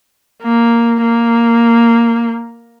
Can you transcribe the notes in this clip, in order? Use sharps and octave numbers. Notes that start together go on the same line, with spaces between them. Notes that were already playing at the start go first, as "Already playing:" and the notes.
A#3
A#3